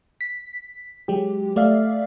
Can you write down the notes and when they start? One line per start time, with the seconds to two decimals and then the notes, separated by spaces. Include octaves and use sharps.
0.21 B6
1.08 F#3 G#3 G4
1.56 A3 D5 E5 F5